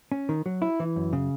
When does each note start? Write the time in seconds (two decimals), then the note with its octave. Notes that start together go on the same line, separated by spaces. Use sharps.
0.12 C#4
0.29 D#3
0.46 F#3
0.62 E4
0.80 E3
0.96 F#2
1.13 C#3